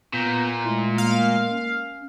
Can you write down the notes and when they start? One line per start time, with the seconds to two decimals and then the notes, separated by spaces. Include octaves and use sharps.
0.13 A#2 B3 A#5 G6
0.65 G#3 A3 E4 C6
0.98 A#3 F5
1.49 C#4